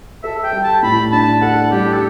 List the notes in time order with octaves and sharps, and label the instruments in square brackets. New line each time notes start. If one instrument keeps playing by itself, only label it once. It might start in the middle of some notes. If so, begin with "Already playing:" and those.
[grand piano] A4 [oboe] E5
[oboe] G5
[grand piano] G3
[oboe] A5
[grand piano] A2 [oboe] B5
[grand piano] D4 [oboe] A5
[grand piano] A4 [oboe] F#5
[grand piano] G3 [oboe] G4
[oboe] A4